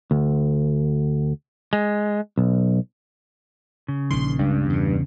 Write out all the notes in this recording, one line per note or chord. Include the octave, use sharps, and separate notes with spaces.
D2
G#3
B1
C#3
A#1 D#3 C6
C#2 G2
E2 B2